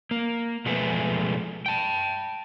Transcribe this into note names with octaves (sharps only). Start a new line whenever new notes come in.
A#3
B2 F3 G#3 A3 G#4 B4
G5 A5